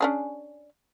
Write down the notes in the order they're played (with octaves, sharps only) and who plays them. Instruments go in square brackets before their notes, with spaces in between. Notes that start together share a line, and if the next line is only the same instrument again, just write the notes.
[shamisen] C#4 D4 G#4